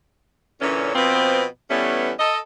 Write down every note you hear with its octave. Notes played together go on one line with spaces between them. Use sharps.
A#2 D3 E3 C#4
B2 F3 B3 C4
E3 G3 A3 B3 C#4
A4 D#5